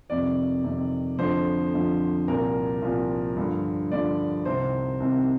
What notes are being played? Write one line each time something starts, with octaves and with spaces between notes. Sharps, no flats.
F2 C3 D#3 D5
F2 C3 D#3
F2 D3 F3 C5
F2 D3 F3
C2 A#2 F3 A#4
C2 A#2 F3
G2 D3 F3
G2 D3 F3 D5
C2 C3 D#3 C5
C2 C3 D#3